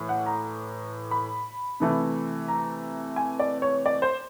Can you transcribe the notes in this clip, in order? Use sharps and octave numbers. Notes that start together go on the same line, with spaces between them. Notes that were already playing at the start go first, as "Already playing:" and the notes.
Already playing: A2 E3
F#5
A#5
B5
C3 E3 A3
A#5
G#5
D5
C#5
D5
C5